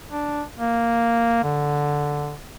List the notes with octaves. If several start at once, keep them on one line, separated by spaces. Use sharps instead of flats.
D4
A#3
D3